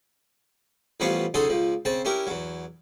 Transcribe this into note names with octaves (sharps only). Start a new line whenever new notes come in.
A1 F3 G3 B3 C#5 F5
C#2 F#3 D#4 G#4 A4 C6
C#2 F3
C#3 C4 A5
C#4 E4 G4 A#4
E2 F#3